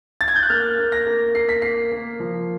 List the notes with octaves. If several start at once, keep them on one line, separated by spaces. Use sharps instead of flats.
A6
G#6
G6
F#6
A#3 F6
A#3
A#6
A#3
A#3 C7
B6
A#3 C7
A#3
F3